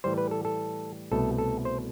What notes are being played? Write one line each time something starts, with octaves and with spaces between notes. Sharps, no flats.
A2 E3 G3 C5
B4
A4
A4
C2 B2 A3 A4
A4
C5